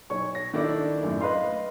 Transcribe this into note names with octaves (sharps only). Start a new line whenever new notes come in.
B1 C#5 C#6
A#6
D#3 D4 E4 A4 D5
F#2 A2
B4 D#5 F5 C6